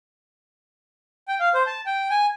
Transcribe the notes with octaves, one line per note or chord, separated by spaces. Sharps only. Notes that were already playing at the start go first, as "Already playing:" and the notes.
G5
F5
C5
A5
G5
G#5